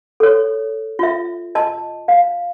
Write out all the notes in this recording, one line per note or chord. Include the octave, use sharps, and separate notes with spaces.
A4 C#5
F4 E5
D#5 A5
F5